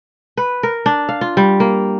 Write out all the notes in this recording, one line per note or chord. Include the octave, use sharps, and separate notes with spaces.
B4
A#4
D4
F5
F4
G3
A#3